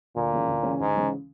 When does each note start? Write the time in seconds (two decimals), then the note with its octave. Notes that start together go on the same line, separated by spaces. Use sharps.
0.16 D2 A#2
0.32 C#3 E3 G#3 C#4
0.48 D2
0.63 C#3 E3 G#3 C#4
0.80 D2 G#2
0.96 C#3 E3 G#3 C#4